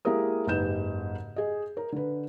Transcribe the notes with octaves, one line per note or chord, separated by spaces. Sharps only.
G#3 A#3 E4 G4 A#4 D#6
F#1 G#2 G4 B4 G6 E7
G#4 D#5
A#4
D3 B4